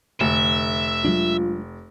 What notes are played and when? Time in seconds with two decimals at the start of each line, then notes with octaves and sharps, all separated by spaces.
0.21 F1 D3 E5
1.05 F#3 G#3 D4 F4